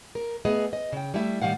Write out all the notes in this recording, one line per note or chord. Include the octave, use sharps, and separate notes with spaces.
A#4
A3 B3 G#4 D#5
D#5
C#3 G5
G3 A3 E4 E5
A2 D#3 G3 C4 F5 F#5